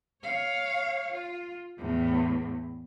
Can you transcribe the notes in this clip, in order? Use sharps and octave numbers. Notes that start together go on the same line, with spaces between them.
C#5 F5
F4
E2 A2